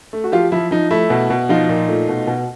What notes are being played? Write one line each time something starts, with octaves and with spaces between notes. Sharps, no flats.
A3
F#4
F3 F4 G4
F3 E4
F3 D#4
A3 E4
B2
B2
F3 D#4 F4
A#2
A3
B2
B2